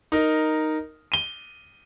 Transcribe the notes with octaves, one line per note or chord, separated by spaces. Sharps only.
D#4 A#4
D#7 G7